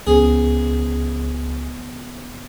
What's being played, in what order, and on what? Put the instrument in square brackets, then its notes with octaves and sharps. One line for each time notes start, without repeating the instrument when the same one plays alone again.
[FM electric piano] C#2 [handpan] C#3 F3 B3 [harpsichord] G#4